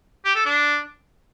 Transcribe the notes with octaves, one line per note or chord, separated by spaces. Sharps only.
G4
A4
D4